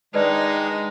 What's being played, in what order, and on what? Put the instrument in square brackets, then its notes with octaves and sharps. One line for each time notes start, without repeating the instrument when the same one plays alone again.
[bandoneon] D#3 D4 [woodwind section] G#3 [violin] D#4 [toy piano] B4 D5 G5